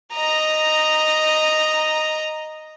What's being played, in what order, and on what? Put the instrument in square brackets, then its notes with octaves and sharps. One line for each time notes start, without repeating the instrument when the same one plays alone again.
[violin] D#5 A#5